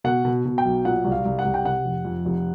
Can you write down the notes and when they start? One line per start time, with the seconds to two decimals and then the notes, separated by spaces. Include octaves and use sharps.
0.04 B2 F#5
0.25 B2
0.45 B2
0.58 G5
0.65 B1
0.85 A#2 F#5
1.04 C2
1.12 F5
1.25 C2
1.39 F#5
1.45 C2
1.54 G5
1.65 C3 F#5
1.85 F1
2.05 F2
2.25 F1